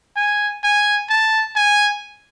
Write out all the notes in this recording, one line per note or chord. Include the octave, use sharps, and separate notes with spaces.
G#5
G#5
A5
G#5